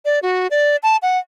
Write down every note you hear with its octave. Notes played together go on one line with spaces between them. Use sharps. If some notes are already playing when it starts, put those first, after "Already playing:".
D5
F#4
D5
A5
F#5